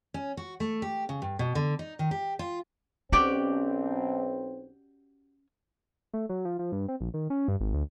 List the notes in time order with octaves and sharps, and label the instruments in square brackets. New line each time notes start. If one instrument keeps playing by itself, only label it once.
[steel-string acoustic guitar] C#4
F#4
A3
G4
C#3
G2
B2
D3
D#4
D#3
G4
F4
[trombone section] B1 C4 [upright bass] C#4 [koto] F#4 G4 D5
[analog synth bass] A3
F#3
F3
F3
G2
C4
A#1
D#3
C#4
G2
G#1
D2